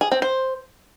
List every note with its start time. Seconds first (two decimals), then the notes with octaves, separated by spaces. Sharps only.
0.01 G#4
0.12 C4
0.22 C5